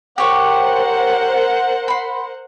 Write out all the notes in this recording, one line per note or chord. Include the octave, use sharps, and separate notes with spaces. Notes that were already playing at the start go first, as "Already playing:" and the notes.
G4 A#4 C5 C#5 F#5
B5 C6